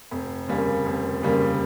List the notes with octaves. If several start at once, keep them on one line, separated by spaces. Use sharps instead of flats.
F1
D#2 C#3 G3 A#3
F1
D#2 C#3 G3 A#3